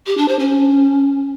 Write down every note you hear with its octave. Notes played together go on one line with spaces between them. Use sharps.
G4
D4
C5
C#4